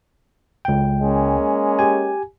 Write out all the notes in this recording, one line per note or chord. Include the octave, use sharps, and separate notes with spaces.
C#2 G5
G#3 A#3 C#4
G4 G#5